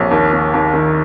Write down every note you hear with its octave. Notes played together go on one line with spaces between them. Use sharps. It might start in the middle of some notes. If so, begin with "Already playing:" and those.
Already playing: A#1 C#5
D#2
D#2
D#2
D#3